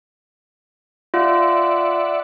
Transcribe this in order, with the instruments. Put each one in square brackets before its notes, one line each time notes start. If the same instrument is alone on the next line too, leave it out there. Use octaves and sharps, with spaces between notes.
[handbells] F4 [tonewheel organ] D5 E5 F#5